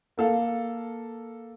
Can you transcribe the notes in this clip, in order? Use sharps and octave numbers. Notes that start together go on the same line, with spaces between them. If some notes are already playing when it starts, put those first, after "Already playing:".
A#3 A4 F5